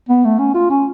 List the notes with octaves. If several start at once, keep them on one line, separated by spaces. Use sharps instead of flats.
B3
A3
C#4
F4
C#4